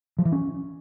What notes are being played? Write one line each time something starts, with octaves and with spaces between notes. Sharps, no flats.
F3
E3
C#4